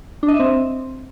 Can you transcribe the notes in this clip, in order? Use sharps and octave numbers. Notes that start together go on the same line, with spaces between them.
D4
D#5
E5
C4